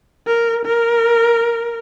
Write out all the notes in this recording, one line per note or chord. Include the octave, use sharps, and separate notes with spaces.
A#4
A#4